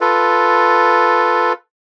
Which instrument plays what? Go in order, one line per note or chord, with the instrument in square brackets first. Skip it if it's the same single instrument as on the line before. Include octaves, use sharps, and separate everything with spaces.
[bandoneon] F4 A4 B4